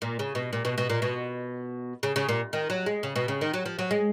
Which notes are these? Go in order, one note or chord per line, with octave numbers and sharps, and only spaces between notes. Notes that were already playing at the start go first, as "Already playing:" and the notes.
A#2
C#3
B2
A#2
B2
B2
A#2
B2
C#3
C#3
A#2
D#3
F#3
G#3
C#3
B2
C#3
D#3
F#3
F3
F#3
G#3